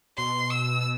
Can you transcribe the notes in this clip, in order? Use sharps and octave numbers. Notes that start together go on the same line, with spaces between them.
B2 C6
E6